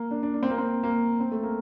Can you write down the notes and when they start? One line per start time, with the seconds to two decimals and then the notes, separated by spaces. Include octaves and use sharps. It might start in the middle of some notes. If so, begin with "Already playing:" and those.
Already playing: A#3
0.11 D4
0.23 D4
0.34 D4
0.43 C4
0.50 A#3
0.58 C4
0.83 A#3
1.20 C4
1.32 A3
1.43 A#3